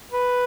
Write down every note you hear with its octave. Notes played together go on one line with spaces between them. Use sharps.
B4